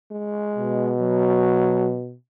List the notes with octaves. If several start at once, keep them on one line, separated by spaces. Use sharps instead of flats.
G#3
B2
F#3